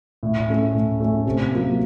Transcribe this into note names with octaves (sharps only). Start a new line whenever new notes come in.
A2
A3 C#4
A2
A3 C#4
C3
F#3 A#3